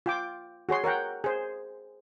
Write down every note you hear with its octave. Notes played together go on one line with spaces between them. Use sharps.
F4 G5 D6
F#4 G#4 C#5 C6
A#4 C#5 F#5 G5
G#4 C5